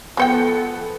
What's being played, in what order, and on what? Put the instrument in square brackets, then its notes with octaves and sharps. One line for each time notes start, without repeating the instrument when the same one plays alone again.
[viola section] F3 A4 [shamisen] G#3 C5 G5 [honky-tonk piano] B3 C#7